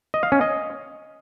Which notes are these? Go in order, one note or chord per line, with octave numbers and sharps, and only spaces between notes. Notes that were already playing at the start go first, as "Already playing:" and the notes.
D#5
F5
C#4
D#5